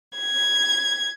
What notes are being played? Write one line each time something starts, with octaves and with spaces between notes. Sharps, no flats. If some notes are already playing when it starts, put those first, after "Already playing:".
G#6